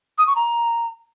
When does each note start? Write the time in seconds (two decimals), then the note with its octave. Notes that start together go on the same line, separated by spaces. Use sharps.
0.18 D#6
0.27 C#6
0.36 A#5